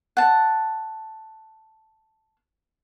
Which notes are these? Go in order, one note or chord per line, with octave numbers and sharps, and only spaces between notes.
F#5 A5